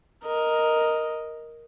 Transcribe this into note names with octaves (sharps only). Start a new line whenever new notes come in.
A#4 D#5